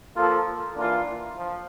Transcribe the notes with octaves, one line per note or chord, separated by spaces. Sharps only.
F3 A#3 F4 A4
E3 A#3 D4 F4
F3